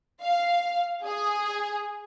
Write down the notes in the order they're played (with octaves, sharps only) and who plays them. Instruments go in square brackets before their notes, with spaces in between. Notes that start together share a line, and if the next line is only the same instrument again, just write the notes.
[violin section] F5
G#4